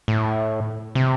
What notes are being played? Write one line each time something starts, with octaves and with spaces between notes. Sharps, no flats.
A2
C3